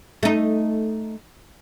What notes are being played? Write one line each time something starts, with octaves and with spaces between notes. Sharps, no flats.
A3 D#4